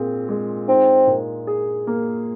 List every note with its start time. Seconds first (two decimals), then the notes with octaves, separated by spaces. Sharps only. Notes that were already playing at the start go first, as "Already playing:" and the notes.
Already playing: A#2 C4 G#4
0.29 G#3
0.68 C4 D#4
1.07 A#2
1.47 G#4
1.87 A#3